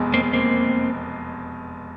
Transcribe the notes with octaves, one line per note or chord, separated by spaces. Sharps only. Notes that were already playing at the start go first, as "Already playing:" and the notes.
Already playing: F1 E2 B2 G#3
A#3 C4
A#3 C4